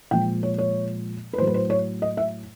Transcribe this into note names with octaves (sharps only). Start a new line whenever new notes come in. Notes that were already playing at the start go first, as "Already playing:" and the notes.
A#2 F3 G#3 G5
C#5
C#5
B4
A2 F#3 C5
B4
C5
C#5
D#5
E5